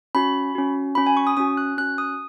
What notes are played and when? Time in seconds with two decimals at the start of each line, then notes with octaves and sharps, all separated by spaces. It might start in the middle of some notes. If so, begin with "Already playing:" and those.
0.15 C#4 F#4 B5
0.55 C#4 F#4
0.95 C#4 F#4 B5
1.07 G#5
1.17 C#6
1.27 D#6
1.37 C#4 F#4 D#6
1.57 F#6
1.78 C#4 F#4 F#6
1.98 D#6